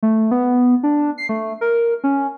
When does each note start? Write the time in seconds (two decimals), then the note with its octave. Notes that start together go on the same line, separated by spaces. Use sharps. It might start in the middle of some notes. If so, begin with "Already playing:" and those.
0.03 A3
0.31 B3
0.83 D4
1.18 C7
1.29 A3
1.61 A#4
2.04 C#4